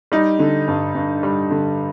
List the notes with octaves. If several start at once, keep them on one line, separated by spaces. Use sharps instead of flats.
G3 D#4
D3
G2
G2
G3
D3